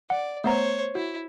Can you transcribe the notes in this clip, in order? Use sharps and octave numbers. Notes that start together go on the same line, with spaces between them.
D5 F#5
A3 B3 C5 C#5 A#5
E4 F#4